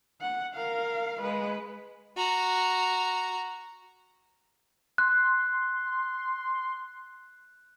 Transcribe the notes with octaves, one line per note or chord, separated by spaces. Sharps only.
F#5
A#4 F5
G#3 B4
F#4 A#5
C6 F#6